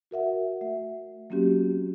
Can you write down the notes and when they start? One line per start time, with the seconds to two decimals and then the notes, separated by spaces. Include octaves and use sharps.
0.11 F#4 A#4 E5 F#5
0.61 A3 E5
1.30 F#3 A#3 C4 C#4 F#4 G4